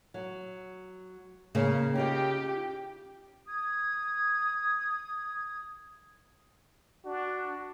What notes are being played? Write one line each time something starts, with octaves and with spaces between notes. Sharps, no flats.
F#3
C#3 A#3 C#4 D#4
D#4 F4 G4 D#5
D#6 G#6
D4 F#4